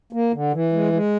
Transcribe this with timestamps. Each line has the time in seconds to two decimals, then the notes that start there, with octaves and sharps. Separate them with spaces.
0.13 A#3
0.33 D3
0.53 E3
0.73 G#3
0.93 G#3